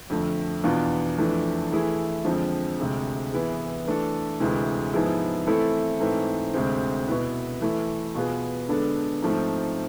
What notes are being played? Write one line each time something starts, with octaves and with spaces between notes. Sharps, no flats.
F2 D3 A3
E2 B2 B3 D4 F4
F2 E3 A3 D4
E3 A3 E4 G#4
F2 D3 F3 G#3 C4
D2 C3 G#3
E3 B3 E4 G#4
E3 A3 D4 A4
D2 C3 E3 G#3
G#2 F3 B3 E4 G#4
E3 A3 C4 E4 A4
G#2 E3 A3 C4
D2 C3 G#3 C4
B2 B3 E4 B4
E3 A3 E4
B2 B3 F4 G#4 B4
D3 G#3 B3 D4 A4
G#2 F3 A3 C4